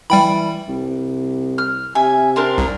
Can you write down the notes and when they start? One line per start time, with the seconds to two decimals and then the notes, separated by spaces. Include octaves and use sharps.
0.10 E3 G3 G5 B5
0.69 C2
1.58 F6
1.95 C3 E5 G#5
2.36 C4 D4 A#4
2.58 C2